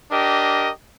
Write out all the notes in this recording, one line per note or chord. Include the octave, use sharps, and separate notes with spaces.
D4 G4 A#4 D#5